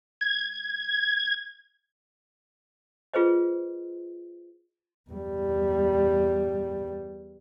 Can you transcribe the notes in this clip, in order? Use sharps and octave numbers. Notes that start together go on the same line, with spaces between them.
G#6
F4 G#4 B4 C5 D#5
E2 G3